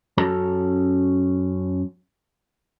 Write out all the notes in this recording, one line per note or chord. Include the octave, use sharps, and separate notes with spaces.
F#2 C#4 F#4 A4 A5 A#5